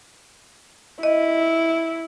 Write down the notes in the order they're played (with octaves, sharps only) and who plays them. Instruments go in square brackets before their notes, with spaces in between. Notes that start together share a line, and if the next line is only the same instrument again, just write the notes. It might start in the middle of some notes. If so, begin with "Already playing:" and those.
[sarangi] E4 [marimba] D#5